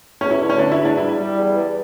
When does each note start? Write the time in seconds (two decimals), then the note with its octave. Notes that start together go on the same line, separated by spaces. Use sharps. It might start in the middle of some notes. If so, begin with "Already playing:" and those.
0.21 E2 C#4
0.31 E4
0.40 D3
0.50 C#4
0.59 E2 D4
0.72 E4
0.79 E2
0.85 D4
0.97 G3 E4
1.17 G3
1.36 E2
1.55 E2